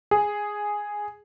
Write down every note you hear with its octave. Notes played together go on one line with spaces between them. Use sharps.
G#4